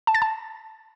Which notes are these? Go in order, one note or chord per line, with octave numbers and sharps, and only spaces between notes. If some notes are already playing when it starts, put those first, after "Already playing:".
A5
A6
A5